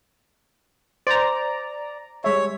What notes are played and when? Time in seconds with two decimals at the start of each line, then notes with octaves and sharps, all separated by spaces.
1.07 C5 D5 A#5
2.24 G3 G#3 C#5 E5